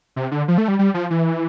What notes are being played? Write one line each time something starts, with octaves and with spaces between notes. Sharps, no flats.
C3
D3
F3
A3
G3
G3
F3
E3